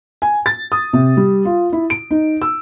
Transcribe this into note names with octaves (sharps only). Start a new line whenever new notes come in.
G#5
A6
D#6
C3
G3
F4
E4
D7
D#4
E6